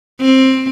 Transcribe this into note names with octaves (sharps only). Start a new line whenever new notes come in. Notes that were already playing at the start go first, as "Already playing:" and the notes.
C4